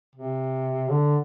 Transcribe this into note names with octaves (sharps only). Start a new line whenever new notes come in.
C3
D3